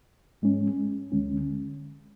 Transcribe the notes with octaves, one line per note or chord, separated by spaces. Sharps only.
G#2 G#3 C#4
D2 D3 G#3 C#4